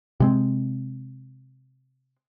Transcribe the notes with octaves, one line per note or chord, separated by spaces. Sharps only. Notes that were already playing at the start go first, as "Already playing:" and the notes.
C3 G#3 C4